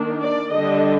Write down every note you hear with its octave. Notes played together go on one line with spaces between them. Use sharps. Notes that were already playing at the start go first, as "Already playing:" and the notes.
Already playing: D#3 A#3 D4
D5
D3 G3 D4 D#5